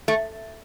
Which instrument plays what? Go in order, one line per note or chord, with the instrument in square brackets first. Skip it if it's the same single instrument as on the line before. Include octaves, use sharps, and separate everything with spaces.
[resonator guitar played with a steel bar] A3